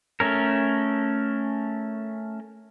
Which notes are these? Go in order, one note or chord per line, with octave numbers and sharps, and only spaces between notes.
A3 C#4 A#4